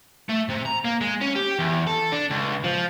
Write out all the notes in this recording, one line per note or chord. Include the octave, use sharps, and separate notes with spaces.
A3
C3
A#5
A#3
G#3
C#4
G4
E2
A4
D4
C#2
F3